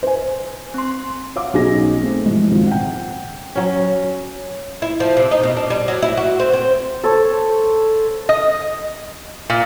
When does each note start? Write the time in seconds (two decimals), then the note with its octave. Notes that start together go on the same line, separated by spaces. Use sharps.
0.03 C5 G#5
0.74 C4 C6
1.36 C#5 F5 F#5 D6
1.53 B1 C#4 D#4 G#4 D#5 A#6
2.01 A3 C4
2.26 A#2 E3 F3 G#3
2.51 G#1 C#2 A#2
2.67 F#5 G5
3.55 F#3 C#4
4.82 E4
5.00 F3
5.17 C3
5.31 D#4
5.43 B2
5.57 D4
5.70 G3
5.88 F#3
6.02 E4
6.17 F#4
6.39 C4
6.53 C4
7.04 A4 C5 C#5
8.29 D#5
9.50 A#2